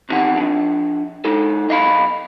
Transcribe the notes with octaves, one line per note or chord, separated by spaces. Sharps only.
B1 E2 C3 D#3 E3 F#5
F3 D4
G#3 D#4 A4
B1 D#5 F5 B5